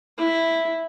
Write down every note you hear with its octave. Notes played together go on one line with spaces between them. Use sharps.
E4